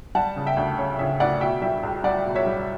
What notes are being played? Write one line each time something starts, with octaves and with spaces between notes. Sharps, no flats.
G3 F#5 A5
C#3
E5 G5
D2
C#3 C#5
C#3 C#5 E5
D2 D5 F#5
B2 E5 G5
G3 E5 G5
C#2
G3 D5 F#5
B2
C#5 E5
G3